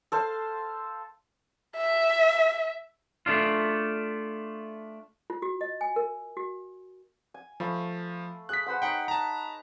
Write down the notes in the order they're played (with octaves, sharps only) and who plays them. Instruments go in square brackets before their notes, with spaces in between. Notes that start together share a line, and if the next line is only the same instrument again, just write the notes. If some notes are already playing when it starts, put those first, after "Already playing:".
[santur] A4 C5 F5
[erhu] E5
[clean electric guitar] A3 D4 F4
[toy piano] F4
F#4
D#5
G#5
A#4
F#4
[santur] G#5
[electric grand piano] F3 [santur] A3 F5 B5
[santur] G#4 G#5 [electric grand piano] F#6 B6
[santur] B4 C5 F#5
[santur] D#4 C#5 [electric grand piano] F#5 G5
[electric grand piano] A5 A#5